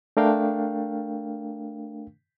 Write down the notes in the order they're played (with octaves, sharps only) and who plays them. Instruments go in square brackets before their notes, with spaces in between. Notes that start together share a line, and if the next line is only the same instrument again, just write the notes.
[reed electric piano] A3 D4 A#4 F5 G5